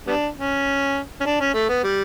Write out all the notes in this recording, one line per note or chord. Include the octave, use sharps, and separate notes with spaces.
G3 B3 D4
C#4
C#4
D4
C#4
A3
B3
G3